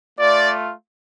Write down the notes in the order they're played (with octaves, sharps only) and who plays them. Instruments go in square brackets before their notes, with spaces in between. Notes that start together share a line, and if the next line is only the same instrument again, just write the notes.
[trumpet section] A3 F4 D5